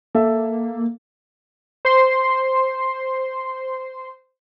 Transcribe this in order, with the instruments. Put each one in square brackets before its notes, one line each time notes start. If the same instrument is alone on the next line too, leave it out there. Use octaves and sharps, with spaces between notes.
[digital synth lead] A#3 [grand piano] A4 E5
[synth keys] C5 C6